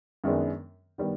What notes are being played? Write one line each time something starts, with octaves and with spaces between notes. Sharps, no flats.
F#2 D#3 G#3 B3 D4
D#3 G3 B3